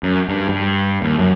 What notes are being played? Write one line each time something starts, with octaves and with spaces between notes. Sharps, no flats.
F#2
G2
G2
D#2
F#2